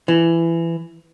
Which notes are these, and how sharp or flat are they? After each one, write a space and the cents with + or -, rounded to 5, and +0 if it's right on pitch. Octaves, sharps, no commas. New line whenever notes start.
E3 +20